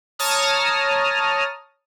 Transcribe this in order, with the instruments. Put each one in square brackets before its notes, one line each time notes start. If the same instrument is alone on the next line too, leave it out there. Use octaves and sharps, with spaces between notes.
[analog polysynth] C#5 A5 A#5 D#6 F6